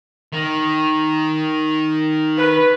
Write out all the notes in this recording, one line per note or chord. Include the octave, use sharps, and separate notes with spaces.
D#3
B4